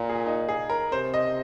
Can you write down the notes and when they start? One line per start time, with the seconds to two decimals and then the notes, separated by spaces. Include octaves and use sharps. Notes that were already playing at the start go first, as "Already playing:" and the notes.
Already playing: A#2 A#4
0.09 G#4
0.26 D#4
0.49 G#4
0.69 A#4
0.92 C3 C5
1.14 D#5